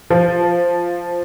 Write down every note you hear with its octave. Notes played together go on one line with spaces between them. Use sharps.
F3